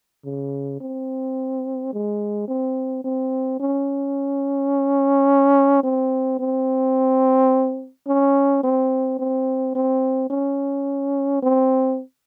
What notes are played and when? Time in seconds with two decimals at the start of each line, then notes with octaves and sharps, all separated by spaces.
0.25 C#3
0.80 C4
1.93 G#3
2.48 C4
3.04 C4
3.60 C#4
5.84 C4
6.39 C4
8.07 C#4
8.63 C4
9.19 C4
9.75 C4
10.30 C#4
11.43 C4